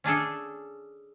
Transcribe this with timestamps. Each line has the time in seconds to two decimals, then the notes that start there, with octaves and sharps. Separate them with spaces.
0.04 C#4 D4 G#4 A4